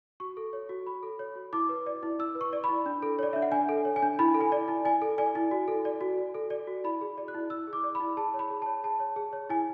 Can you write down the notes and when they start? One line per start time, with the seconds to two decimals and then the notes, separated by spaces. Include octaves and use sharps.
0.20 F#4 C#6
0.37 A4
0.53 C#5
0.69 F#4
0.87 F#4 B5
1.03 A4
1.19 C#5
1.36 F#4
1.53 E4 D6
1.69 B4
1.86 D5
2.03 E4
2.19 E4 E6
2.35 B4
2.41 C#6
2.53 D5
2.64 E4 B5
2.86 D4
3.02 A4
3.19 C#5 D5
3.33 D4 E5
3.42 F#5
3.52 D4 G#5
3.69 A4
3.85 C#5
3.96 G#5
4.02 D4
4.19 E4 B5
4.34 A4
4.41 G#5
4.52 D5
4.68 E4
4.85 E4 G#5
5.02 A4
5.18 D5 G#5
5.35 E4
5.51 F#4
5.68 A4
5.85 D5
6.01 F#4
6.18 F#4
6.35 A4
6.50 D5
6.67 F#4
6.84 E4 B5
7.01 G#4
7.18 D5
7.28 F#6
7.34 E4
7.50 E4 E6
7.67 G#4
7.73 D6
7.84 D5
7.95 B5
8.00 E4
8.17 G#4 A5
8.34 C#5
8.39 B5
8.50 G#4
8.62 C#5 A5
8.83 G#4 A5
9.00 C#5
9.16 G#4
9.33 C#5
9.50 E4 G#5